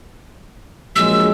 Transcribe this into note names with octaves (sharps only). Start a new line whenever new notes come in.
A#1 F#3 G#3 E6